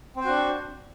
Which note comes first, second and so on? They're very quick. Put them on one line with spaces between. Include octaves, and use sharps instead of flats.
C4 C5 F#4 D4